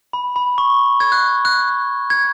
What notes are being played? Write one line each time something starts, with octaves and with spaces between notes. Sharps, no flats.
B5
B5
C#6
G#6
F#6
F#6
G#6